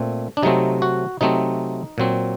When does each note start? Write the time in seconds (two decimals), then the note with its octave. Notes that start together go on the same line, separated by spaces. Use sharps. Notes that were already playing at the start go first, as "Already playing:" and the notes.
Already playing: A#2 A3 C4
0.37 D4
0.43 C3 F#3 A3 C4 D#4
0.82 F#4
1.21 C3 F#3 A3 C4 D#4
1.98 A#2 F#3 C4